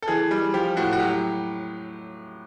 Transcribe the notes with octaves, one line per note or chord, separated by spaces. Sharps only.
A4
E3 G#4
G3
F3 G4
A2 F#4
F#4
F#3 G4